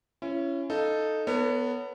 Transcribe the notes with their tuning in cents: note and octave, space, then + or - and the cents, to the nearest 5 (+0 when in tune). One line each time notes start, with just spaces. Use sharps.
C#4 +0 E4 +35
D#4 +0 A4 +0 F5 -5
B3 +0 A4 +45 C#5 +20